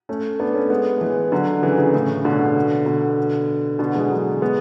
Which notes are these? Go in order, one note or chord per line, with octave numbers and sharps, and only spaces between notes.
A3 C#4
B3 D4
A3 C#4
G#3 B3
E3 G#3
D3 F#3
C#3 E3
C#3 E3
A2 C#3
B2 D3
B2 D3
B2 D3
E3 G#3
D3 F#3
G#3 B3